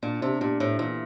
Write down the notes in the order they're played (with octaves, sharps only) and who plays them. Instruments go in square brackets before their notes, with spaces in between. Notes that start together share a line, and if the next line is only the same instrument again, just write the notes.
[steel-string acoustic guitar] A#2 [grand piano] D4
[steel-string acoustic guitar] C3 [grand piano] D4
[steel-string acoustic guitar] A#2 [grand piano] D4
[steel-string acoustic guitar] A2 [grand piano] C5
[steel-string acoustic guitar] A#2 [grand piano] E3